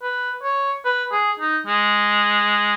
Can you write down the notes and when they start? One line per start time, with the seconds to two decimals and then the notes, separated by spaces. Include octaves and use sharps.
0.02 B4
0.43 C#5
0.85 B4
1.12 G#4
1.39 D#4
1.66 G#3